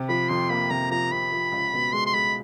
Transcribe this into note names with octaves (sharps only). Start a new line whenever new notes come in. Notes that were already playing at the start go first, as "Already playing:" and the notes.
Already playing: C3
F3 B5
F2 C6
A#3 B5
C3 A#5
F3 A#5
C3 B5
F3
C#2
B2
G#3 C6
C6
G#3 B5